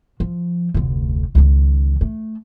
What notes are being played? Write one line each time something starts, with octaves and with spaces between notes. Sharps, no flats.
F3
F1 D2
C#2 D#3
A3